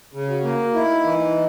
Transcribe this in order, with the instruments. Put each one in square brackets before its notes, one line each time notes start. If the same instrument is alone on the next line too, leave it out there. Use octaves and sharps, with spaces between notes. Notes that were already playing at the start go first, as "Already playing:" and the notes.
[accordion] C#3
[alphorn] F#4
[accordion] A#3
[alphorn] D#4 [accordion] E4
[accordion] E3